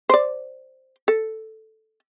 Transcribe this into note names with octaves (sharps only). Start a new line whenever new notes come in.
C5 D5
A4